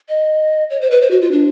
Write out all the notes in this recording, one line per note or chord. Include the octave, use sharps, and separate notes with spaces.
D#5
C#5
C5
B4
C5
F#4
F4
D4